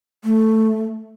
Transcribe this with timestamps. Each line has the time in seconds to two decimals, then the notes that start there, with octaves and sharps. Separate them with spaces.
0.24 A3